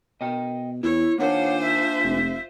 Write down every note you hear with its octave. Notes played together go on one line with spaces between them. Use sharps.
B2 D#5 G5
E2 E4 C#5
D#3 A#3 D4 F4 C5 C#5 F5 F#5
E5
F1